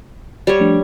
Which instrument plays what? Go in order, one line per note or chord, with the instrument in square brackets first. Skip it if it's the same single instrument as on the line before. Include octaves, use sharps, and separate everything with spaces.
[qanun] G3 C#5
[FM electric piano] F3 A3 D4